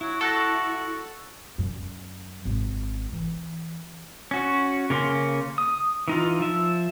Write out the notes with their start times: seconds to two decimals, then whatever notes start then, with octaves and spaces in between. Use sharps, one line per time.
0.01 F#3 E4
0.21 F#4 A4 C#6 F#6 A#6
1.58 F#2
2.45 G#1
3.12 E3
4.31 C#4 F#4
4.90 C#3 A#3 C#4 C6
5.58 D#6
6.08 E3 D#4 F4
6.40 F3 E5